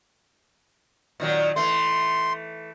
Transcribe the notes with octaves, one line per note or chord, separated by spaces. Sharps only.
A#2 D#3 F#3
E3 A3 C6